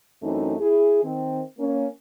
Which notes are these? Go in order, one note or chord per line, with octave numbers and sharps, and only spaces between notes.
F#2 E3 A3 C4 D#4
E4 G#4
D#3 C4
A#3 C#4